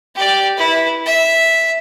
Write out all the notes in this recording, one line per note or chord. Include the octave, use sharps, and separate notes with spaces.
G4 D5
E4 B4
E5